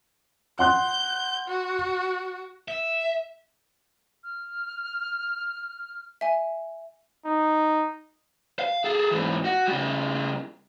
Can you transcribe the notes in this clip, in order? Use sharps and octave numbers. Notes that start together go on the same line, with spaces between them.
F#5 C6 F#6 G6
F#4
E5
F6
E5 G#5
D#4
F5
G#4 A4
G#2 E3
F#4
C#3 G3